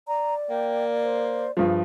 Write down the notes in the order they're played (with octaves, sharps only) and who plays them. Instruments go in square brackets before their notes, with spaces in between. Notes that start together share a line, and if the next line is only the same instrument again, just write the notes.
[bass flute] D5 [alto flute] A#5
[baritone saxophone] A#3 [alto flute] G5
[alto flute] C5
[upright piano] G2 F3 [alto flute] G#4